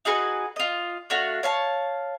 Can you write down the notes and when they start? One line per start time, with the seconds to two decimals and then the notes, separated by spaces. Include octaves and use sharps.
0.05 D#4 F#4 G#4 B4
0.56 F4 D#5
1.10 A3 D4 F#4 F5
1.43 C#5 F5 A5